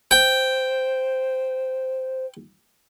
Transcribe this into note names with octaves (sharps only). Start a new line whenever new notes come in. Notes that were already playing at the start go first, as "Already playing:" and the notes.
C5 G5